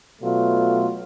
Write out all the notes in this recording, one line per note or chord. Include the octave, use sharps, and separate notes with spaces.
B2 F#3 A3 F4